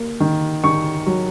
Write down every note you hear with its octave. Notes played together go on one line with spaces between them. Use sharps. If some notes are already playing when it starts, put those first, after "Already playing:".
Already playing: A#3
D#3
D#3 C#6
F#3